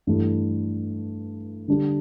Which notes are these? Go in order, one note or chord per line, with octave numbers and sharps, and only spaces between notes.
G2 E3 A3
D3 G3 D4 G4